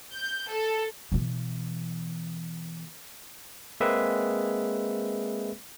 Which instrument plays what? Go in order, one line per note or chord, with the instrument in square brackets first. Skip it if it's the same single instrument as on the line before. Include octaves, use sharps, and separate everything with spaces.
[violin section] G6
A4
[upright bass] B2 E3
[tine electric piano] G#3 A#3 C4 G#4 B4 E5